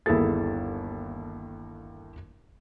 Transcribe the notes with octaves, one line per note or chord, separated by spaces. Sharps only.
G1 D#2 E4 G#4 A4 A6